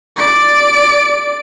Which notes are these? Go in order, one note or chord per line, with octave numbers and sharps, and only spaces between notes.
D5 D7